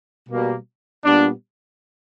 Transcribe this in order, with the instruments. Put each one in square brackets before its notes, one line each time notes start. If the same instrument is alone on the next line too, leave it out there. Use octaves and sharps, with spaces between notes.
[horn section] B2 G3 A#3
A#2 G3 B3 D4